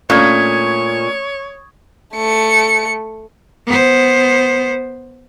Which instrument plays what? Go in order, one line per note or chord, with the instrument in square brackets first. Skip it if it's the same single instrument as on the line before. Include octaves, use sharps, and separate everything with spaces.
[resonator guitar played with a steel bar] A#2 [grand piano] A3 C#4 D4 [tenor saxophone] C#5 [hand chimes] C#6 D#6 G#6
[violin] A3 C#7
[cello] B3 C5